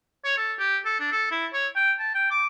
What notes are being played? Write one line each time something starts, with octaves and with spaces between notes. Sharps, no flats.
C#5
A4
G4
A4
D4
A4
E4
C#5
G5
A5
G5
D6